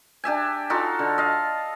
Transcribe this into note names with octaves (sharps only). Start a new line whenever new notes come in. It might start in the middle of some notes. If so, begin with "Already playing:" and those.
D4 G4 E5 G#5
D#4 F4 F#4 A4
D3
D#5 F5 A5